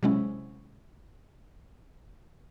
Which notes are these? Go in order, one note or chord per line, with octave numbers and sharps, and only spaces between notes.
C3 F#3 G#3 C#4 E4